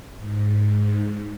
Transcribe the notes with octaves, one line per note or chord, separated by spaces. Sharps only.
G#2